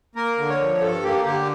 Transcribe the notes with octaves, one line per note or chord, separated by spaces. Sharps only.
A#3 A#4
D3
C#5
F3
G2 A4
A#3 G4
D3 G4